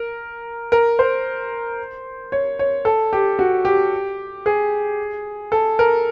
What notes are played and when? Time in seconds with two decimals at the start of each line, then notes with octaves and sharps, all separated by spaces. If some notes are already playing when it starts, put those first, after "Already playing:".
Already playing: A#4
0.72 A#4
0.99 C5
2.32 C#5
2.59 C#5
2.85 A4
3.13 G4
3.39 F#4
3.65 G4
4.46 G#4
5.52 A4
5.79 A#4